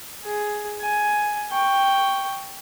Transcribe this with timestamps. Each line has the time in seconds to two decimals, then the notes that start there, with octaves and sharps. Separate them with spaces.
0.25 G#4
0.81 G#5
1.52 G5 C#6